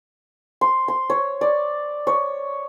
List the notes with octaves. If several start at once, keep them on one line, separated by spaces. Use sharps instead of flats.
C6
C6
C#5
D5
C#5